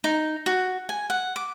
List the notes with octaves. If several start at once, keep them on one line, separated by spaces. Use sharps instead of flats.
D#4
F#4
G#5
F#5
D6